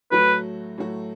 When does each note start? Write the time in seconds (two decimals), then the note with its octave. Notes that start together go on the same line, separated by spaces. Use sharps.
0.11 A2 F#3 A3 F#4 B4
0.78 A2 F#3 A3 F#4